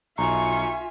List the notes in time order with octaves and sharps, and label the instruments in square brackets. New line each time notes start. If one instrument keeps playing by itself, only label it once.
[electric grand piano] B1 [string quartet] F4 E5 G#5 [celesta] A#5 [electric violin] C#6